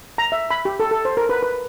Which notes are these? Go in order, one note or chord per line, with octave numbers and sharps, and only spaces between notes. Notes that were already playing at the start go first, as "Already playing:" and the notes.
A#5
E5
B5
G4
A4
A4
C5
A#4
B4
B4